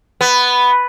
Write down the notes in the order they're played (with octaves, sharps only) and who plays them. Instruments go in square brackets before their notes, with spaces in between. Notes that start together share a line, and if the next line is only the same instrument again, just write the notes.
[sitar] B3